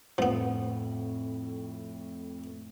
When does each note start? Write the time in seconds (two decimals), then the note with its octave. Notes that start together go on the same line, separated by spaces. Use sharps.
0.18 F2 A2 F3 B3